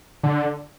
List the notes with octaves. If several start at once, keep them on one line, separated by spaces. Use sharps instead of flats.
D3